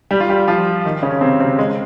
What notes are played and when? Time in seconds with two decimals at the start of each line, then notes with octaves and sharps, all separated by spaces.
0.11 G3 G4
0.20 F4
0.29 G3 G4
0.48 F3 F4
0.85 D#3 D#4
1.03 C#3 C#4
1.21 C3 C4
1.40 C3 C4
1.59 G#3